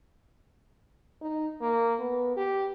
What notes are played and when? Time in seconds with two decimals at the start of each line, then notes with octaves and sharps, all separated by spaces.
1.22 D#4
1.61 A#3
2.00 B3
2.37 G4